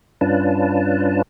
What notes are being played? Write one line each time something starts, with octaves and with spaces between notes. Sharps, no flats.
G2 C#4 D4 F4 B4 A5